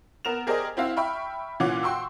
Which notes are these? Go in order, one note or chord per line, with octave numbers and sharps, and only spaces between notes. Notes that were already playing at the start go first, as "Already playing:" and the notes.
B3 A#4 E7 F7
G4 G#4 A#4 C5 D5 D#5
C4 E4 F#4 F5
E5 G5 B5 C#6 F6
A#2 E3 C#4 F5 F#5 D6
F#4 G5 C6 C#6 E6